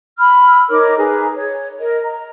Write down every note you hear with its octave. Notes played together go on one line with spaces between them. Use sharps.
B5 E6 F6
D#4 A#4 C#5 D6
G#4 B4 A#5
C#5
A#4 D#5
A#5